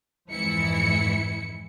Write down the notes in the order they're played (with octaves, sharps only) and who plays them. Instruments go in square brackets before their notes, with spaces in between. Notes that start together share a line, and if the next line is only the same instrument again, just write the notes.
[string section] F2 G#2 E3 E4 C#7